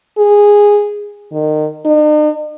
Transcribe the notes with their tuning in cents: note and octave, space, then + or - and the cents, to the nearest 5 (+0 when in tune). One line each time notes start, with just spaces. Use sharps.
G#4 -10
D#3 -25
D#4 -45